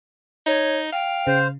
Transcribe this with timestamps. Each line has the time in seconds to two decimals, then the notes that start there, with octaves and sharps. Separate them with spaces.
0.46 D#4 C#5
0.93 F5 G5
1.27 C#3 C5